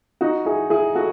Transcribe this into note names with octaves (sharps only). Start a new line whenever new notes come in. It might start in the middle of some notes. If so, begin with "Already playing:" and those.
D#4 F#4
E4 G#4
E4 G#4
F#4 A4